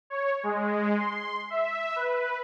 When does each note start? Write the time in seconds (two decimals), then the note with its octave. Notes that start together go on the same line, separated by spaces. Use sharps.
0.10 C#5
0.43 G#3
0.97 C6
1.50 E5
1.96 B4